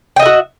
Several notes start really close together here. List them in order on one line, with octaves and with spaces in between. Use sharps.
G5 D#5 E5 F#4